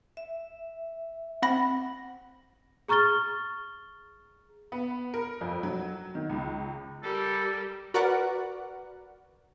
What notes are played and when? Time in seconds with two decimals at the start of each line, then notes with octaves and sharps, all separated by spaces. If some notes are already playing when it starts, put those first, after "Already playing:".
0.17 E5
1.42 C4 F#5 B5 A#6
2.88 G#4 A#5 C#6 F6 A6 G7
4.72 B3
5.14 A#4
5.41 F2
5.63 F#3
6.15 D#3
6.30 C#2
7.03 G3 A4 A#4
7.94 F#4 A#4 B4 D5 F#5